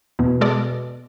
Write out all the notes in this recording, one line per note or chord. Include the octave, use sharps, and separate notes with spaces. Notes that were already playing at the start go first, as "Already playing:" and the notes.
E2 B2
G#3 A4 D5